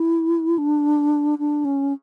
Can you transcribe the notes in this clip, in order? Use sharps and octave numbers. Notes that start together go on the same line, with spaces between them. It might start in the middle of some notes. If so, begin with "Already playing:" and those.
Already playing: E4
D4
D4
C#4